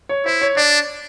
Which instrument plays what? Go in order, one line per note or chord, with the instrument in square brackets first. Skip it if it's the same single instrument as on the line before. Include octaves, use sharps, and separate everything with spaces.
[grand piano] C#5
[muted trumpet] E4 [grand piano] C5
[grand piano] C#5
[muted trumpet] D4 [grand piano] D5